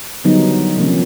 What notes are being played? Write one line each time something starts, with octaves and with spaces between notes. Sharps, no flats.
D3 D#3 F#3 G3 B3 D#4
C3 D#3 F3 A#3 C#4